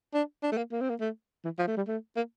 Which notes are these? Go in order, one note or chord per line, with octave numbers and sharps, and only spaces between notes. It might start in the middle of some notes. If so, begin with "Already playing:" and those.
D4
D4
A3
A#3
A#3
C4
A#3
A3
E3
F3
A3
G3
A3
A#3